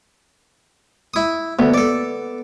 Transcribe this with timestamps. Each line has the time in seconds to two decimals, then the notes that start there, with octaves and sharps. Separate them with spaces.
1.14 E4 D#6
1.59 D2 B3
1.74 A4 D5